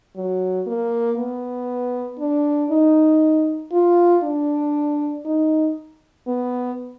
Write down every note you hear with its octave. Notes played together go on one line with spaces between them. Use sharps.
F#3
A#3
B3
D4
D#4
F4
D4
D#4
B3